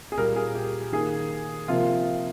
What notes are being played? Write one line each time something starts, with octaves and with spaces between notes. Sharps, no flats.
G#4
A#2 G3 A#3 A#4
G#4
G4
D#3 A#3 G#4
C3 F3 A#3 F4